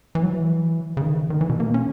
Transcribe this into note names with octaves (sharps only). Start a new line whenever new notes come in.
E3
F#3
E3
C#3
D#3
D#3
E3
B2
A#3
C#4